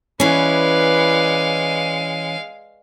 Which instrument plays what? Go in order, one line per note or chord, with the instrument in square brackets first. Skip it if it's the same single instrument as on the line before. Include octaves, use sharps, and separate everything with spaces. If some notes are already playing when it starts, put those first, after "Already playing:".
[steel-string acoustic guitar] E3 C#4 [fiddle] G#3 F5 [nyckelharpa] B4 D5